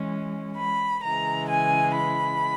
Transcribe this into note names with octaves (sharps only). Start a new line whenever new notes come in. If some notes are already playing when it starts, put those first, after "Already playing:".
Already playing: E3 G#3 C#4
B5
C#3 E3 G#3 A#5
G#5
B5